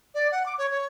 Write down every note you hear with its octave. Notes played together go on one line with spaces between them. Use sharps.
D5
F#5
D6
C#5
C#5